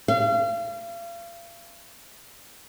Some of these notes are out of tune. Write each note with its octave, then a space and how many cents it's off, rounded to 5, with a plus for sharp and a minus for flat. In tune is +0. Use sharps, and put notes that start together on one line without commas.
F5 -40